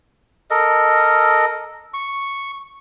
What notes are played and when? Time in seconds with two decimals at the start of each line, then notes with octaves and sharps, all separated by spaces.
0.51 A4 A#4 D#5
1.94 C#6